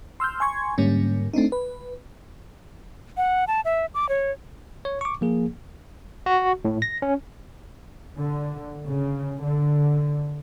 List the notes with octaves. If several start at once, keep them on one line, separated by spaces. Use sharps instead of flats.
C6 E6 F6 G6
G#5 C6 C#6 G#6
G#2 D3 G3 A#3 C#4
A3 C4 D4 D#4
B4
F#5
A5
E5
D6
C#5
C#5
C#6 D6
F3 A#3 G#4
F#4
A2
A#6
C#4
D3
C#3
D3